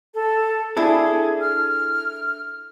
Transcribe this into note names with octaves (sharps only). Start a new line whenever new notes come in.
A4
D4 E4 G#4 A4
F6